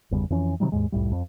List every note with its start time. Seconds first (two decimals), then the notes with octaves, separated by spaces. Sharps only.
0.11 G1 E2 C#3 G3
0.30 F2 E3 C#4
0.60 C3 D#3 F#3 G3
0.72 D#2 G#2 G#3
0.92 C2 F2 A2 G3
1.11 F2